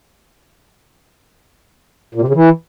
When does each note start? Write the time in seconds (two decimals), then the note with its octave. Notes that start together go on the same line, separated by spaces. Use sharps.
2.15 A#2
2.21 C3
2.28 C#3
2.35 E3